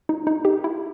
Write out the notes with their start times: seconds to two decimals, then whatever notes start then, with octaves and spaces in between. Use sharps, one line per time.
0.09 D#4
0.27 D#4
0.45 G4
0.64 E4